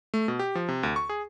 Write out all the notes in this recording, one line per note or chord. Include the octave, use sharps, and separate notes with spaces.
A3
B2
G4
F3
C3
D2
C#6
G#4